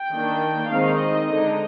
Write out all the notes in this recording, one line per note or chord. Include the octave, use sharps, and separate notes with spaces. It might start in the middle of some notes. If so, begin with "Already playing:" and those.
Already playing: G5
D#3 A#3 D4
D#3 G#3 C4 D#4 F5
D#5
D3 G#3 D#4